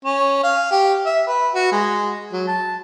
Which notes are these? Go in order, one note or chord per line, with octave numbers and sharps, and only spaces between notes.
C#4
F5
G4
E5
B4
F#4
G#3
F#3
A5